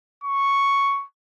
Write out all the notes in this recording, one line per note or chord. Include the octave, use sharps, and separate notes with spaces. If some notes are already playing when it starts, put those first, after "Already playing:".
C#6